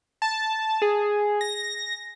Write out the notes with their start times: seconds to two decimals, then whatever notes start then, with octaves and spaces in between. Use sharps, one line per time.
0.22 A5
0.82 G#4
1.41 A#6